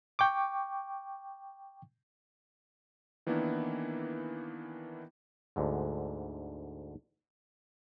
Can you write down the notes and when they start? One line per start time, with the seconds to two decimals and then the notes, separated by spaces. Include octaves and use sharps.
0.19 G5 C#6 D6
3.27 D#3 E3 A#3 B3 D4 E4
5.56 D2 G#2 D3